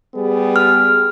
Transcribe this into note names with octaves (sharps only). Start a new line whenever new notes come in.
G3 B3 G#4
F6